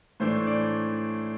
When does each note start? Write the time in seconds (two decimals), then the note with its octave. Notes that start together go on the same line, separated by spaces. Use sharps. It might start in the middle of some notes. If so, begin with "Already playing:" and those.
0.20 A2 E3 A3 D4 C5
0.47 D5